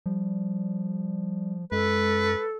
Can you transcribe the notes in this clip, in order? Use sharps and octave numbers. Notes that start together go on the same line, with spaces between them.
F3 G3
F#2 G#3 A4 B4